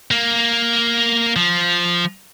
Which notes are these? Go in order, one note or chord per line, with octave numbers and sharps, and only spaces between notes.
A#3
F3